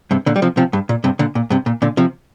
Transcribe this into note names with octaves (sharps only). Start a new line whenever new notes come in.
G2 C3
A#2 D3
G3
C3 F3
C3 F3
G2
A#2
G2 C3
A#2 D3
A#2
G2 C3
A#2
A#2 D3
C3 F3